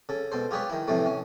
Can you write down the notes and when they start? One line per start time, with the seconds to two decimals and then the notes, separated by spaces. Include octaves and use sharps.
0.09 C#3 A4
0.32 B2 A4 C5
0.51 F4 G4 G#4 B4 C#5
0.70 D#3 E4
0.88 A2 C3 E3 F3 A3
1.06 C#4